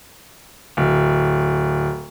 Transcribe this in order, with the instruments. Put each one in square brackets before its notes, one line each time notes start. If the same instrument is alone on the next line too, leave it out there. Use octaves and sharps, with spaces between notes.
[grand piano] D1